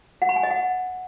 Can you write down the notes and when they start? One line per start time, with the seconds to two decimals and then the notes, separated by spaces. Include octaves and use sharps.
0.22 F#5
0.29 B5
0.36 G#5
0.43 D#5
0.51 F#5